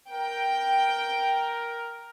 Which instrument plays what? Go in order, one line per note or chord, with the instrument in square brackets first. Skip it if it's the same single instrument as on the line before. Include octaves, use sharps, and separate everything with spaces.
[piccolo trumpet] A#4 [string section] G5